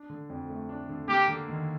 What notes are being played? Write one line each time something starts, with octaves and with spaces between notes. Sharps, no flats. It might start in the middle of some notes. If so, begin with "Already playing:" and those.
Already playing: D4
D3
F2
A3
D4
D3
A#3 G4
D3
D#2